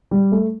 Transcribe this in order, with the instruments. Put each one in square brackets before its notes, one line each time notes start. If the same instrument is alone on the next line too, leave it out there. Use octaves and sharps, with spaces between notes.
[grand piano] G3
A3